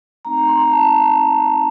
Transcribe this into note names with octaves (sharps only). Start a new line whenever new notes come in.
A3 C4 D#4 A#5
A#5
C6
A#5
A5